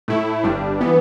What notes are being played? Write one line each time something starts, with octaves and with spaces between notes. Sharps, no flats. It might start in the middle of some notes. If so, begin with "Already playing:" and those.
A2 A3 E4
G1 G2 G3 D4
E3 B3